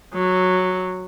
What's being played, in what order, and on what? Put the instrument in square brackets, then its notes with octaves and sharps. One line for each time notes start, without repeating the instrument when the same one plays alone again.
[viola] F#3